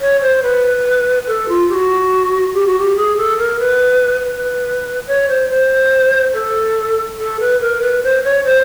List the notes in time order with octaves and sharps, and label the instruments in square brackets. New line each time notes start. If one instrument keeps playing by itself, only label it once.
[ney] C#5
C5
B4
A4
F4
G4
F#4
G4
F#4
G4
G#4
A4
A#4
B4
B4
C#5
C5
C5
A4
A4
B4
A#4
B4
C5
C#5
C5